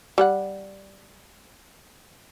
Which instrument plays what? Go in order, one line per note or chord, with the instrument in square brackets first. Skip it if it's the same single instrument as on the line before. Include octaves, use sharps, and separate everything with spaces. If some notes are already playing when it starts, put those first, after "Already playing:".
[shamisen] G3 A4 F#5